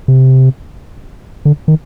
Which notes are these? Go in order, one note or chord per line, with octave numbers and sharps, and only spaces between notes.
C3
D3
D#3